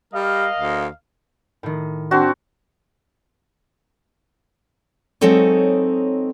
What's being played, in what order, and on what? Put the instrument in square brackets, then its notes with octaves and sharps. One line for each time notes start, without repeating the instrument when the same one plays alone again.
[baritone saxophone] G3 [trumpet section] A#4 D#5 F5
[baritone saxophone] D2
[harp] A2 D#3
[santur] C4 F#4 [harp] D4 A5 C7
[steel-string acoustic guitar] F#3 G#3 C4 D#4 A4 C#5